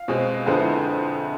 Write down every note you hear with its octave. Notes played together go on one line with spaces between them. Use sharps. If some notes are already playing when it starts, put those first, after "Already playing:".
Already playing: F5
B2 G#3 C4
F2 D3 G#3 B3 C5
E4